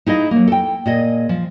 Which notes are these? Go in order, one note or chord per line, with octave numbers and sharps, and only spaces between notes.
D#4 E4 G#4 D#5 F5
F#3 A#3
A4 G5
A#2 G#4 D#5
F3